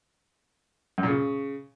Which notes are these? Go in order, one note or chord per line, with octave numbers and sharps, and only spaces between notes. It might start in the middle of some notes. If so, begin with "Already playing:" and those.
F#2
A#2
C#3